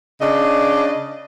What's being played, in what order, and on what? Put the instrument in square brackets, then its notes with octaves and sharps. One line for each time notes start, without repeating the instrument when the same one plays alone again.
[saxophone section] C#3 D4 D#5